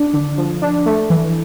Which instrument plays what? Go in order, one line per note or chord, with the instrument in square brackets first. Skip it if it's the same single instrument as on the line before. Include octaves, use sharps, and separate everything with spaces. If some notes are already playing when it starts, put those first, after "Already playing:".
Already playing: [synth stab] D4
D3
F3
D4
A3
E3